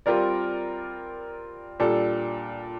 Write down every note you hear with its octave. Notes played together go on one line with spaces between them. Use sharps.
G3 C4 F4 A#4 D5
A#2 G3 D4 A4